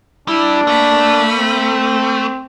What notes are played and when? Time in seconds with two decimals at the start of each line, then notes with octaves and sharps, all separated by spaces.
0.28 G3 D4 E4
0.67 A3 A#3 B5
1.38 C4